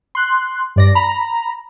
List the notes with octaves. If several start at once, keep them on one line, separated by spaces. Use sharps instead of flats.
C6 F#6
G2 D5 A#6
A#5 B5